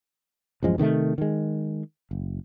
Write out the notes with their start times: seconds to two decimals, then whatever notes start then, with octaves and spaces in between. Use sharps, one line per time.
0.63 A1 F#2 F3 G#3
0.78 C3 D#3 F3 A3
1.18 D#3 G#3
2.11 F#1